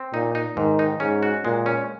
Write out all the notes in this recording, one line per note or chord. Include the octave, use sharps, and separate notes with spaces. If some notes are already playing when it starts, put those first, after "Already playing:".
Already playing: C4
A#2 D#4
D#4
G#2 D#3
D#4
G#2 C#4
F#4
A#2 G#3
C#4